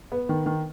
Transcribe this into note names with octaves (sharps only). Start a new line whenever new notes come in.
B3
D#3
D#3